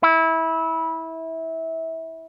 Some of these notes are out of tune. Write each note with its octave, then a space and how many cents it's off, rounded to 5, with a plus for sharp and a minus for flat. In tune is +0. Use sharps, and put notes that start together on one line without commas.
E4 -20